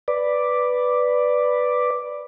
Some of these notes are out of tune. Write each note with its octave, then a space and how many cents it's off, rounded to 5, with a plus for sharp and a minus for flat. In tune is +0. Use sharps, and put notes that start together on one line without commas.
B4 +0 D5 +0